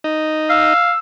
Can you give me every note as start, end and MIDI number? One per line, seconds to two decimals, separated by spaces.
0.04 0.73 63
0.50 0.92 77
0.50 0.99 88